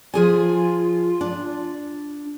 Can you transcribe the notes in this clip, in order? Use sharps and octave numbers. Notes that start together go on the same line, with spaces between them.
F3 F4 G#4 G#5
D4